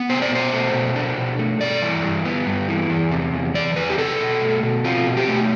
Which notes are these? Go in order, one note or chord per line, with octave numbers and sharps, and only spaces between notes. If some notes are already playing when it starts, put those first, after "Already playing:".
Already playing: B3
C3 C5
D5
B2 C5
A3
B2
D4
B2
A3
G2 D5
E3
G2
B3
G2
E3
E2
C3
E2
E3 D5
E2 B4
G4
C3 A4
B2
A3
B2
C4 F4
B2
G4
A3